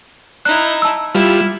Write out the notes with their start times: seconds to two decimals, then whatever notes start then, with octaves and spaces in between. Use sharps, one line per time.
0.45 D#4 E4 F#6
0.82 A5 E6
1.15 G3 E4 F4